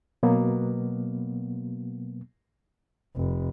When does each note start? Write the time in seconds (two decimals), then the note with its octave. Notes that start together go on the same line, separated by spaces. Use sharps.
0.23 B2 F#3 A#3 B3
3.16 F1